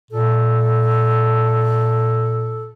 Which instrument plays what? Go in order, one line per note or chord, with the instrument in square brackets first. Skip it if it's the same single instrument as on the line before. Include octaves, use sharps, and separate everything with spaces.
[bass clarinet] A#2 [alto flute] A4